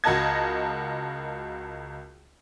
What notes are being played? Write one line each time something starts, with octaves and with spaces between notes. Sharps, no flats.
C#2 F#4 A#4 D#5 A5 G#6